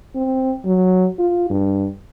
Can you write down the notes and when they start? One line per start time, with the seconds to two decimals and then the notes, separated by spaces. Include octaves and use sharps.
0.16 C4
0.65 F#3
1.19 F4
1.50 G2